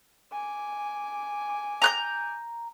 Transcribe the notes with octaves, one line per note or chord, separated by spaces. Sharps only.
G#5 D6
A#5 F#6 G6